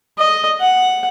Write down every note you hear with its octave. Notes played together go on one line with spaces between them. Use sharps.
D#5
F#5